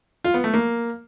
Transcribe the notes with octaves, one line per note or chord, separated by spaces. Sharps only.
F4
B3
A3
A#3